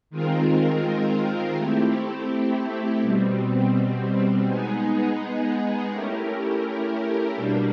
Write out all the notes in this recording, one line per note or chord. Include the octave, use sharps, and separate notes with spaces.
D#3 G#3 C4 F4 A#4
A3 C4 E4 G4
B2 G3 C4
G#3 B3 D#4 G#4
A3 C#4 E4 G4 A#4
B2 G3 A#3 D4